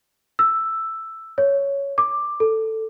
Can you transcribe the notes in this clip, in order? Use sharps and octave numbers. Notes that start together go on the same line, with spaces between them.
E6
C#5
D6
A4